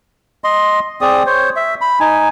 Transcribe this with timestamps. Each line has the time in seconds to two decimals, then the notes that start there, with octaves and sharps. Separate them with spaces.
0.44 D#5 C6
1.01 C4 G#4 D5 D#6
1.26 C5 C#5
1.56 E5
1.81 B5
2.00 D#4 G#5